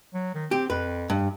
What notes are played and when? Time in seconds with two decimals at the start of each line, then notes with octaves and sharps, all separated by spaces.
0.14 F#3
0.35 D#3
0.51 C4 G4
0.70 F2 B4
1.10 G2